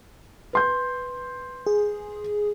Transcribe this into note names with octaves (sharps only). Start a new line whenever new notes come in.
B4 C6 G6
G#4